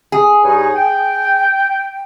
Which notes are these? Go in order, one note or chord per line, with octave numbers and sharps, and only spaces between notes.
G#4
G2 D#4 C#5
G5